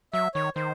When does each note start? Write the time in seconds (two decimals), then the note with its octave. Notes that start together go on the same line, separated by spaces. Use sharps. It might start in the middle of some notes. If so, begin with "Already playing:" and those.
0.13 F#3 E5
0.34 D#3 C#5
0.56 D#3 C5